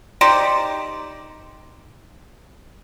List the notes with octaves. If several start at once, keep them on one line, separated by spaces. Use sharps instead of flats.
D#4 G4 C5 D5